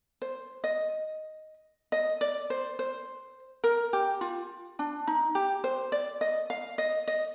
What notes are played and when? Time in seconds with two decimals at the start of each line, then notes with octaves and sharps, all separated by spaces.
0.22 C5
0.64 D#5
1.92 D#5
2.21 D5
2.50 C5
2.79 C5
3.64 A#4
3.93 G4
4.21 F4
4.79 D4
5.07 D#4
5.35 G4
5.64 C5
5.92 D5
6.21 D#5
6.50 F5
6.78 D#5
7.08 D#5